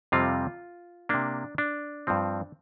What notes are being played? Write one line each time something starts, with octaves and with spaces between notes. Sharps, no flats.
F2 C3 G3 C4 F4
C3 A#3 D4
D4
G2 F3 C4